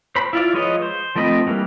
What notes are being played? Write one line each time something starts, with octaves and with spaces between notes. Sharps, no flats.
C5 B5
E4 F4 D5
F3 G#3 B4 C#5 D#5
C5
F3 A3 C4 D#5 B5
E3 G3 A#3